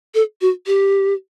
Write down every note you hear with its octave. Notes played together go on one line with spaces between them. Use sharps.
A4
F#4
G4